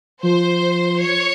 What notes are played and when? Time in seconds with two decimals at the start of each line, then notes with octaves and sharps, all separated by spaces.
0.23 F3 C5
1.01 C#5